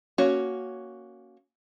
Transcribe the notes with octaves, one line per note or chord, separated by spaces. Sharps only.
A#3 C#4 F#4 C#5